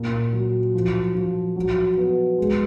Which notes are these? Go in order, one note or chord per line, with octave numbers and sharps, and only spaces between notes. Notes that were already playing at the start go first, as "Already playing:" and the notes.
Already playing: A#2
F#3
F3
F3
F#3
B3
G#3